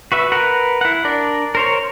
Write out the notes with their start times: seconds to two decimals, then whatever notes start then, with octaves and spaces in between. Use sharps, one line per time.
0.12 F#4 B4 E5
0.32 A#4 B4 F#5
0.81 E4 F#5
1.05 D4 A#4 D5
1.55 A#4 C5 C#5